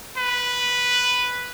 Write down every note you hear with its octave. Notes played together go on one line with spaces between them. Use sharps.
B4